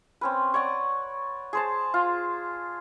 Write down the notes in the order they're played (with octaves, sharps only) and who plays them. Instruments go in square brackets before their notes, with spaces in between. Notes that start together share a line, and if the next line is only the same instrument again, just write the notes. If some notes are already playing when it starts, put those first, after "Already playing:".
[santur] C4 C#4 B4
C#5 D5 F#5 C#6
G#4 C5 A5
F4